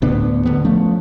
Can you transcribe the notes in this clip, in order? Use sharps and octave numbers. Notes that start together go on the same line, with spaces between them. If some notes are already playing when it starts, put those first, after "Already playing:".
D2 A2 B3 D4
D2 D3 G3 B3
F3 A3 C#4